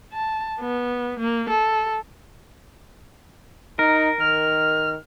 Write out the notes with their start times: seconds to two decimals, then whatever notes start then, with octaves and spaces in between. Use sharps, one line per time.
0.13 A5
0.60 B3
1.19 A#3
1.49 A4
3.79 D#4 A#4
4.20 D#3 F6